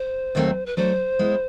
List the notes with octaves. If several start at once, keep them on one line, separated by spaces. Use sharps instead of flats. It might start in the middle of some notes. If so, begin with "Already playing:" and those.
Already playing: C5
D#2 D#3 F#3 A3 C4
B4
F#3 A3 D4 C5
G#3 B3 E4